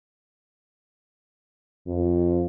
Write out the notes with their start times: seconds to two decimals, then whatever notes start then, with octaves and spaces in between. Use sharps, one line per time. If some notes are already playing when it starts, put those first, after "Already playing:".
1.87 F2